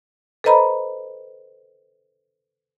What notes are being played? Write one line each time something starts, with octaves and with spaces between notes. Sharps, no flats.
A4 B4 C5 D#5 A#5 B5